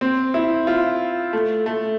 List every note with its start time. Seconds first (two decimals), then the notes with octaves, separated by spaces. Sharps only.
0.01 C4
0.34 E4
0.67 F4
1.33 A3
1.66 A3